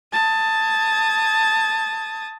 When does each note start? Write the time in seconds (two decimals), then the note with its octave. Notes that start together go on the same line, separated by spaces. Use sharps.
0.12 A5 D#6 G#6